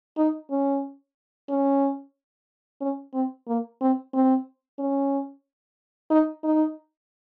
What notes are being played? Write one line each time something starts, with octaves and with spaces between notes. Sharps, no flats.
D#4
C#4
C#4
C#4
C4
A#3
C4
C4
C#4
D#4
D#4